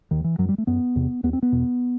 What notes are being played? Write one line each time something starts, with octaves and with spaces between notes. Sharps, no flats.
D#2 D#3
E3
F#2 F#3
G3
A3
F#2 B3
E2 C3
D#2 B3
C4
B3
E2 B2